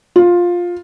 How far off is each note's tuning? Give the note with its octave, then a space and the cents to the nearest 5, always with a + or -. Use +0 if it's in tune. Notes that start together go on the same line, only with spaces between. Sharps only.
F4 +10